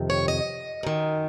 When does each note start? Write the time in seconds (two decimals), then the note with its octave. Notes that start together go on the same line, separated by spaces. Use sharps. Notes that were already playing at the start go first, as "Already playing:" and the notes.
Already playing: F2 C3 D#3
0.10 C#5
0.28 D#5
0.83 F#2 D#3